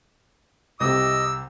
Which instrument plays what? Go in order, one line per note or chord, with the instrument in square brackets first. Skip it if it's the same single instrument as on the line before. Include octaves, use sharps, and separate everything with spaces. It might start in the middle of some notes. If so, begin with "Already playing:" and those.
[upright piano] C2 C3 [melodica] D#5 [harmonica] D6 E6